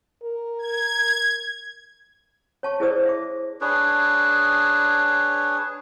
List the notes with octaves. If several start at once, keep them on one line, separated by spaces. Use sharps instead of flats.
A#4
G#6
C#5 A5 C#6
E4 G#4 B4 C5 D5 D#6
E5 D6
D4 G#4 B4 C#5